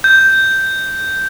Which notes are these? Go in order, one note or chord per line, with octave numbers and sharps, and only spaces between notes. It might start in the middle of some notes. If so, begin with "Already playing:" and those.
G6